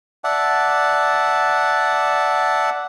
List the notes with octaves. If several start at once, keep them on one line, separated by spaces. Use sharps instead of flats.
D5 E5 F#5 A5